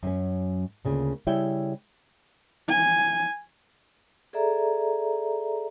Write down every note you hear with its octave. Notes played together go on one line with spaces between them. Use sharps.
F#2 F#3 C#4
D2 C#3 A#3 F4
C#3 G3 E4 C#5 E5 G5
G#5
G#4 A4 D5 E5 A#5